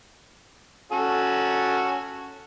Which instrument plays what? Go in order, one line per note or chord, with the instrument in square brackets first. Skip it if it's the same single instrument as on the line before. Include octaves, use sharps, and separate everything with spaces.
[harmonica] C#4 F#4 A4